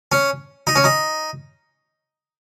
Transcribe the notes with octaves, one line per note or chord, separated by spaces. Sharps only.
C#4
D#4
C#4
D#4